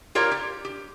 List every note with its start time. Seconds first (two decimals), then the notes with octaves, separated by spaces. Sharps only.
0.15 F4 G4 A#4 C#5 D5
0.31 G4
0.65 G4